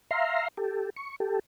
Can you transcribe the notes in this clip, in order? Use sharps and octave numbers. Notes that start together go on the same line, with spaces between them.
E5 F5 A#5 C6
G4 A4
C#6
G4 A4